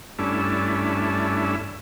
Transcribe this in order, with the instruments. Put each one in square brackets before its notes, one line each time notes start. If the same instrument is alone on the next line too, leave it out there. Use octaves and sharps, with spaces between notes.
[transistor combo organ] G2 A3 C#4 D4 E4